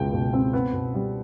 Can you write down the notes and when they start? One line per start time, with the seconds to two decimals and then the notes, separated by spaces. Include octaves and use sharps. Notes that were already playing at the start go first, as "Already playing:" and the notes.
Already playing: C#2 B2 G#3 G5
0.13 B2
0.33 C4
0.53 B3
0.73 B2
0.94 G3